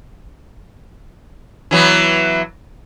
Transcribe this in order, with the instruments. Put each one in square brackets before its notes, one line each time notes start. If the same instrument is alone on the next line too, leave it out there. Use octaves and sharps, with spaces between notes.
[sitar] E3 F#3 B3